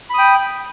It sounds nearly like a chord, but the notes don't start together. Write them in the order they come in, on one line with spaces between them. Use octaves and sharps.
B5 D#6 G5